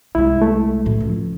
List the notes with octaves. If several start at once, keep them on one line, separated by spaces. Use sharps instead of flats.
C2 G#3 E4
A3
A2 F#3
C#2 F3